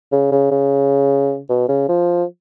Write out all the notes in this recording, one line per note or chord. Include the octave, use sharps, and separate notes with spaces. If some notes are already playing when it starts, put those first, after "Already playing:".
C#3
C#3
C#3
B2
C#3
F3